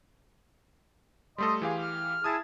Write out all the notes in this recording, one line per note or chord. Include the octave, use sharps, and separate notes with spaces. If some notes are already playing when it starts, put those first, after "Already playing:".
G3 A3 A4 D#5 C6 D#6
E3 G4 G#4 F5
F6
E4 G#4 A5 D#6 G#6 A6